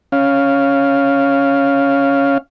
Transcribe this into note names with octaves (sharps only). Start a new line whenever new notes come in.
C#4 F5